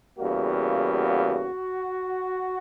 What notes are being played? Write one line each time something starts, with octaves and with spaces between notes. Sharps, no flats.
E2 C#3 G3 A#3 F#4